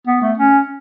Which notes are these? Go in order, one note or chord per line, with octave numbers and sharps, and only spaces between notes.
B3
A3
C#4